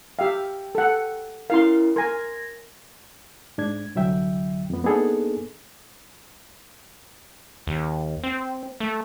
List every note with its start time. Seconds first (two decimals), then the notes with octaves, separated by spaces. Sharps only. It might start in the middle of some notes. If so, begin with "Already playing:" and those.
0.19 G4 E5 F5 G5
0.75 A4 F#5
1.50 C#4 E4 A#4 F5 C6
1.96 A#4 G#5 C6 G#6 A#6
3.58 G#2 D4 G#6
3.95 C2 D3 F#3 E5 G5
4.70 F2 B3
4.84 A#3 B3 D4 D#4 G#4 A4
7.67 D#2
8.24 C4
8.80 A3